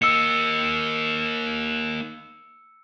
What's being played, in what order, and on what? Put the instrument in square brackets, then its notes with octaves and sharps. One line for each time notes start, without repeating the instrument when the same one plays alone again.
[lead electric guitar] A#3 D#4 [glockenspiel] E6 C#7